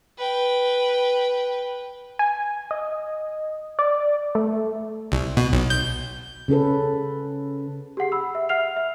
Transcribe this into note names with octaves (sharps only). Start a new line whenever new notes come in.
B4 G5
G#5
D#5
D5
A3
C2
B2
B1
G6
C#3 C#4 A4 B4
G4 G#4 F#5 C7
B5 E6
E5
E5 F#5 F6 C7 F7
E5